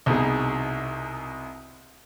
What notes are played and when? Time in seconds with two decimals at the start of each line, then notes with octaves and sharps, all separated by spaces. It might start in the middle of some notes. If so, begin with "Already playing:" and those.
0.06 C2 B2 D#4 G#4